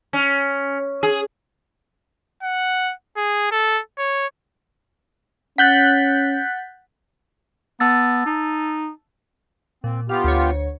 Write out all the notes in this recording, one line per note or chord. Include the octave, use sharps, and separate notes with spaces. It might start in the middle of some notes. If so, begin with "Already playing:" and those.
C#4
G#4
F#5
G#4
A4
C#5
C#4 F#5 F#6 G6 A6 B6
B3 A5 E6 A6
D#4
A#2 C4
B3 F4 G4 F5
D2 C#5